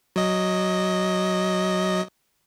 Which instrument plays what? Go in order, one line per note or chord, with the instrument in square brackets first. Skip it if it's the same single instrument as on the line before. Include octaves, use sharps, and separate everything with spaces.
[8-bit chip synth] F#3 D#5